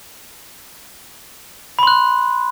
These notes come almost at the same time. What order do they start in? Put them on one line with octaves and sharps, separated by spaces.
B5 C6 F#6